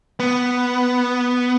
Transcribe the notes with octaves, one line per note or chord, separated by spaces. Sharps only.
B3